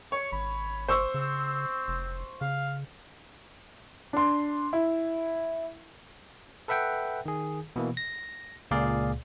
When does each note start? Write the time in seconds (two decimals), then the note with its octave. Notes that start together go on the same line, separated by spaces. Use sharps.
0.12 C#5 C#6
0.32 G#1 B5
0.88 G1 C5 C#6 E6
1.14 C#3 C4
1.88 F1
2.41 C#3 F5
4.13 D4 C6
4.73 E4
6.68 A4 B4 E5 F#5 G5
7.26 D#3 G#4
7.76 B2 E3 A#3
7.97 A#6
8.71 C#2 A#2 G#4 D5 F5